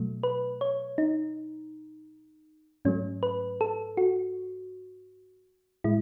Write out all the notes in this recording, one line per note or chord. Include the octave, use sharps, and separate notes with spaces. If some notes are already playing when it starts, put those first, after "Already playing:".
Already playing: B2 F#3 A3
B4
C#5
D#4
G#2 F#3 A3 C#4
B4
A4
F#4
A2 G#3 E4